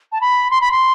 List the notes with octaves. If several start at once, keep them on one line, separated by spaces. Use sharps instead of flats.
A5
B5
C6
B5
C6